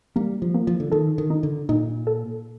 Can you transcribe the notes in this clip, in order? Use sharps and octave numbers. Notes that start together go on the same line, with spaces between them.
G3 A#3
F3
A#3
F3
D3
D#3 A4
D#3
D#4
D3
A#2 D#4
A4